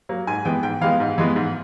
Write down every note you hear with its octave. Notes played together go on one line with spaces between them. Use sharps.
F#3 A#3
G#2 G#5
E3 G#3 B3 G5
G#2 G5
E3 G#3 B3 F5
G#2
E3 G#3 B3
G#2